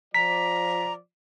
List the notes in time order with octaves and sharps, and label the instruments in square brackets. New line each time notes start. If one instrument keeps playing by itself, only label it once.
[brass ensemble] F3 D5 [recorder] A#5 [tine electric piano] B6